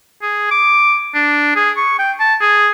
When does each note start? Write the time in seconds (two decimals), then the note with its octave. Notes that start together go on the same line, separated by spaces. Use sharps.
0.22 G#4
0.51 D6
1.15 D4
1.56 G#4
1.77 C#6
1.99 G5
2.20 A5
2.41 G#4